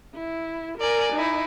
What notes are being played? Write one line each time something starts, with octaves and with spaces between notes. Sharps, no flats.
E4
A#4 D5 G#5
D#4 E4